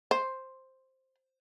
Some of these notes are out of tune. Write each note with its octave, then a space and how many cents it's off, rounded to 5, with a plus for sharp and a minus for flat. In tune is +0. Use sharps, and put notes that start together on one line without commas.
C5 +5